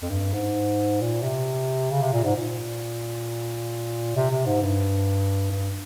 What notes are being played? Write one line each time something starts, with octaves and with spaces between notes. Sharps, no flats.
F2
G2
G#2
A#2
C3
C#3
C3
A#2
G#2
A#2
C3
C3
G#2
G2
G2